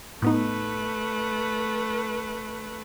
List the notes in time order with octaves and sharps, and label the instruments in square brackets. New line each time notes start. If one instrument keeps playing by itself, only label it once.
[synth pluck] A2 B3 D#4 [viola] A3 B4